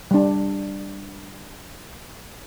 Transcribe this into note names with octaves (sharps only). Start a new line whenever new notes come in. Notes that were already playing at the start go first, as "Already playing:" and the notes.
G3 D4